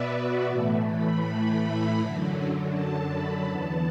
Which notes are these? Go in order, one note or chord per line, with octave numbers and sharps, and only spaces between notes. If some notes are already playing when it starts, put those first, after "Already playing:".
Already playing: B2 B3 B4 D5 E5
F#4
A2 E3 A3
B5
F#2 D3 F#3
A5
B5
E2 E3 B3 A5